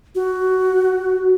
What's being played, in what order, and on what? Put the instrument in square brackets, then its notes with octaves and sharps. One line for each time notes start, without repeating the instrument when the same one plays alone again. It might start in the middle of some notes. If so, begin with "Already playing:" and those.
[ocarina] F#4